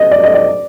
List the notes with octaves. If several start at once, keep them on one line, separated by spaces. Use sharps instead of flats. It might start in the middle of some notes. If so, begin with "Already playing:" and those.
Already playing: D#5
D5
D#5
D5